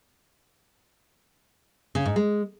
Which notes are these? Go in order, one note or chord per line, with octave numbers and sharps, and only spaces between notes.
C#3
G#2
G#3